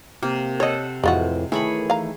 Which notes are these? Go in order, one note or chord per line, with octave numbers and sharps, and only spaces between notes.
C3 A#3
A4 C#5 D#5 F#5
F2 A2 E3 G#3 F4 F#4
D#3 E3 A3 G#4 C#5 B5
F5 A#5